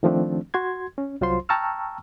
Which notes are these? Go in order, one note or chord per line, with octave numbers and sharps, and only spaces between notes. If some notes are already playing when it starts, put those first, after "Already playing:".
D#3 F3 A3 C4 D4
F#4 C6 G#6
C#4
C2 F#3 F4 C5 C6
G5 A5 A#5 C#6 E6 F6